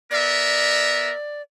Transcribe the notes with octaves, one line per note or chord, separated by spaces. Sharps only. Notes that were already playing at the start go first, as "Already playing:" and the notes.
B3 A#4 D5 E5